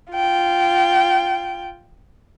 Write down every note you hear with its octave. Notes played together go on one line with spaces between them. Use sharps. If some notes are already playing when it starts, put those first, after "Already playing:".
F4 G5